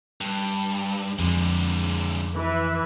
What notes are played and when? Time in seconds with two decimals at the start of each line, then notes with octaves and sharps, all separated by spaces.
0.21 G2
1.19 F2 D3 G#3
2.35 E3 B4 E5